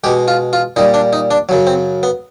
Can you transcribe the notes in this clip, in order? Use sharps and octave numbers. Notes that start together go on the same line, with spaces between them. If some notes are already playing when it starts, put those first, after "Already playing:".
B2 G#3 G4
F4
F4
A#2 G3 D#4
D4
D#4
D4
F#2 C#3 F#3
C4
B3